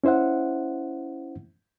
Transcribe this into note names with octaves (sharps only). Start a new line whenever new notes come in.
C#4 E4 C5 E5 F#5